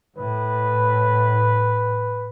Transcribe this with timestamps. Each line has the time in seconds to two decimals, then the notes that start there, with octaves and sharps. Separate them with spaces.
0.18 A2 B4